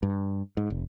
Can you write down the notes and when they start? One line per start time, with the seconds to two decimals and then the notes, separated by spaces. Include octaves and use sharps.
0.03 G2
0.57 G#2
0.70 F1